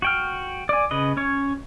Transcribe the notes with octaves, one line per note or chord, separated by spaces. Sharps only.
F#4 G5 F6
D5 G#5
C#3 B4 D#5
C#4 C#5